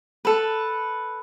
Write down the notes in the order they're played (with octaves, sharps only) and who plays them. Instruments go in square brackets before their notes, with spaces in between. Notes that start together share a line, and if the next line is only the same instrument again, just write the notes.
[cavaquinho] A4 B4